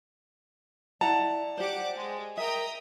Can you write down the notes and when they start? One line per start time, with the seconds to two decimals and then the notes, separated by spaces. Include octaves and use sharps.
1.01 E4 D5 F#5 A5 A#5
1.57 G4 C5 F#5 D6
1.96 G#3
2.37 A#4 E5 G5 A#5 D#6